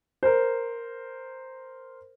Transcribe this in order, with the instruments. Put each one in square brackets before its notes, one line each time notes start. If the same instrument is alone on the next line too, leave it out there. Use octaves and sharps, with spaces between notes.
[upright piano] A#4 C5